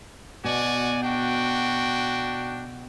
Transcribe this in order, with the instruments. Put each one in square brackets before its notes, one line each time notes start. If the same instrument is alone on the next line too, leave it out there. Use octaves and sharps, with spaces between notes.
[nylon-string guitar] B2 [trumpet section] F#4 D5 G#5
[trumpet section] D4 F#4 G5